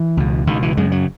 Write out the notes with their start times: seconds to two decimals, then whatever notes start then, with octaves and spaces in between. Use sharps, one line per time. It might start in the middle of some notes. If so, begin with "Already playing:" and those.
Already playing: E3
0.17 C#2 B2
0.47 C#2 B2 D#3
0.62 E3
0.77 F#2 C#3 G#3
0.92 F#3